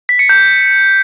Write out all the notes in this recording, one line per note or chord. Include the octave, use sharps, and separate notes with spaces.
B6
C#7
G6